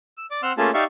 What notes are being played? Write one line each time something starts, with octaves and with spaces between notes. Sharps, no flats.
E6
D5 D6
C4 F#5 C6 E6 F6
A3 A#3 C#4 F4 G#4 A5
D#4 G4 D5 E5 F5 C#6